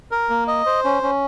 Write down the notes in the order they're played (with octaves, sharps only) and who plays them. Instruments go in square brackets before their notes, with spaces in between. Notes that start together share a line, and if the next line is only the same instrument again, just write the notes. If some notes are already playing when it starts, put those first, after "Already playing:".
[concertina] A#4
A#3
D#5
C5
C#4
C#4